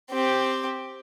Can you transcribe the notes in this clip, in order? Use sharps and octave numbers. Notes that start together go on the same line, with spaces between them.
C4 G4